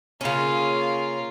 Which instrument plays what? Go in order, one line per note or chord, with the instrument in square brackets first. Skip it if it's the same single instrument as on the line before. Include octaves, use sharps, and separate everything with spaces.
[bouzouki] C#3 C#4 [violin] A#3 F4